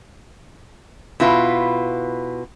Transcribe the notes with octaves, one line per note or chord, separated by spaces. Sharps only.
B2 E4 F4 B4